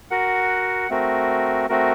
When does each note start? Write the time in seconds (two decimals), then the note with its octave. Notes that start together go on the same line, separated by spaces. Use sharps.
0.11 F#4 A#4 F#5
0.90 A3 C4 F#4 A#4
1.69 A3 C4 F#4 A#4